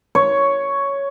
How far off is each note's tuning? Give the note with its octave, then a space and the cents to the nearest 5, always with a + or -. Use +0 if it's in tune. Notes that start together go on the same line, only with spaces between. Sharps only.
C#5 +5